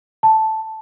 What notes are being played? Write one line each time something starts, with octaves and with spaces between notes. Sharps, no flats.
A5